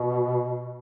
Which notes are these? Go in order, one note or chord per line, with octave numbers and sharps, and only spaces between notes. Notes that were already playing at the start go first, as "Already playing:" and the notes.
Already playing: B2